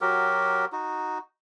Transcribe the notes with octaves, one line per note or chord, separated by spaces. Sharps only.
F#3 F#4 G4 A#4
D#4 F#4